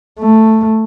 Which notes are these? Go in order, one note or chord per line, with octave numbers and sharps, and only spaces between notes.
A3